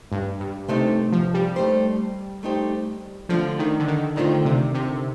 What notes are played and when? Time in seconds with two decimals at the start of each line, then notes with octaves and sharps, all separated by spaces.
0.12 G2
0.40 G2
0.68 C3 A3 D#4 G4 C5
1.12 F3
1.34 G3
1.56 A3 D#4 G4 C5
2.43 A3 D#4 G4 C5
3.29 D3 F3 A3 C4 F4
3.59 D#3
3.79 D3
3.87 D#3
4.16 D3 D#3 A3 C4 F4
4.45 C3
4.74 C3